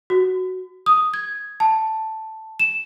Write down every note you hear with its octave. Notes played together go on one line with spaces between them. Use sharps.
F#4
D#6
G#6
A5
E7